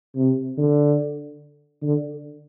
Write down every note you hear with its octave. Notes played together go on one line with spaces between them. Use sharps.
C3
D3
D3